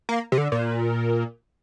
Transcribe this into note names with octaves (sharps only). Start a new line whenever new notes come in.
A#3
C3
D3
A#2